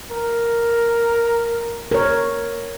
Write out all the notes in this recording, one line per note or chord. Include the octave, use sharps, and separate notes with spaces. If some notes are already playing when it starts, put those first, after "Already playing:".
A#4
A#4 C#5